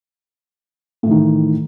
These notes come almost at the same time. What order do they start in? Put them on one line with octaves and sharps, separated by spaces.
A2 E3 D#3